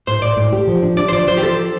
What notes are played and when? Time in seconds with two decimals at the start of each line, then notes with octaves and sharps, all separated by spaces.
0.07 A2 C5
0.22 A2 D5
0.37 A2
0.53 G4
0.68 F3
0.82 D4
0.97 D4 D5
1.08 C5
1.12 F3 D5
1.28 F3 C5
1.37 G4
1.43 F3 A4